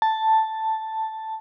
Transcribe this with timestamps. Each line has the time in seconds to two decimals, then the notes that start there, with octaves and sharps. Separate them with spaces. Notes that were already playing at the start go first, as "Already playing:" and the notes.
0.02 A5